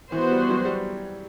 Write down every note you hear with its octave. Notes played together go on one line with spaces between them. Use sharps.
E3 B3 F#4 C5
G3
F#3
G3